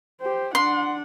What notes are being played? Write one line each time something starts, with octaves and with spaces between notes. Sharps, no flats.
G4 C5
D4 F#5 C6